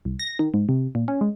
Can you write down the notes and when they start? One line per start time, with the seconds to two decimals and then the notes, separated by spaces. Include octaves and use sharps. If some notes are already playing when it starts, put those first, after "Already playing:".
0.05 C2
0.19 A#6
0.39 D#3
0.54 G#2
0.69 C3
0.95 A#2
1.08 C#4
1.21 G#3